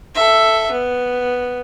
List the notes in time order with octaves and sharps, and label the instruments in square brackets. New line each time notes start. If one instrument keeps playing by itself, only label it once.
[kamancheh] A4 E5
B3